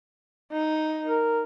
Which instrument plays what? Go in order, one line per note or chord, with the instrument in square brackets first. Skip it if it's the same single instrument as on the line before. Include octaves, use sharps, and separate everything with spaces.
[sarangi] D#4
[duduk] A#4